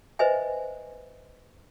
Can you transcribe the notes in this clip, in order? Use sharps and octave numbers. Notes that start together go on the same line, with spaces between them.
B4 C5 D#5 E5 G#5